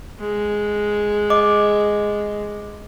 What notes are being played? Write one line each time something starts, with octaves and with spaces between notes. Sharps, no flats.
G#3
D#5 D6